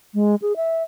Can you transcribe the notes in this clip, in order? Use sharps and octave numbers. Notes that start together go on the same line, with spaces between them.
G#3
G#4
E5